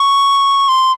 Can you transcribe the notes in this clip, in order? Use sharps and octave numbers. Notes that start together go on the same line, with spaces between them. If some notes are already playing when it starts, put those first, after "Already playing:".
Already playing: C#6
C6